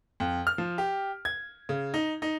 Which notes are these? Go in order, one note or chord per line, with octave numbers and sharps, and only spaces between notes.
F2
F6
F3
G4
G#6
C#3
D#4
D#4